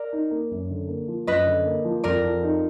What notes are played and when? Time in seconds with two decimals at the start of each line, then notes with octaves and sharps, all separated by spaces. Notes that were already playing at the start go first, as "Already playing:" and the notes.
Already playing: A#4 D5
0.13 D#4
0.31 A#3
0.51 F#2
0.70 D3
0.89 A#3
1.08 F3
1.27 F#2 B4 D#5
1.46 D3
1.66 A#3
1.85 F3
2.04 F2 A#4 D5
2.23 F3
2.43 D#4